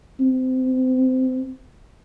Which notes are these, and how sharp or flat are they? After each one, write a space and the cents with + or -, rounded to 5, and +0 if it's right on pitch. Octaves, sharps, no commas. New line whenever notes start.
C4 -25